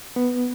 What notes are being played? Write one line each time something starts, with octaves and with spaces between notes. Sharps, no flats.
B3